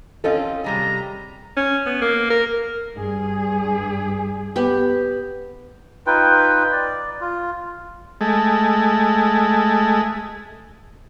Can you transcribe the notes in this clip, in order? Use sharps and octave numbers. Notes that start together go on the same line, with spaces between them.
C4 C#4 F4 A4 D#5
C3 G3 G#4 A#5
C#4
B3
A#3
A#4
G2 G#4
B3 G4
D#4 F4 B4 G5
D5
F4
G#3 A3